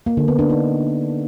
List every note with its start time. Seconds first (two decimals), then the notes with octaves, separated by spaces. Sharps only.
0.06 A#3
0.17 D3
0.28 B3
0.39 D4
0.50 D#4